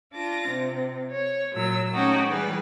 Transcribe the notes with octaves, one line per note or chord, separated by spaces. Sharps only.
D4 F4 D6 A#6
C3
C#5
A#2 F#3 E6
A3 C#4 D#4 F#4 G4
E3 G3 G#4 B4